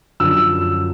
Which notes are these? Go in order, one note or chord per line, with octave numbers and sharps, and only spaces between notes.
F#2 D3 F3 E6